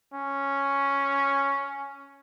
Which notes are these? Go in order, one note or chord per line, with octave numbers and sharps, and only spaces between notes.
C#4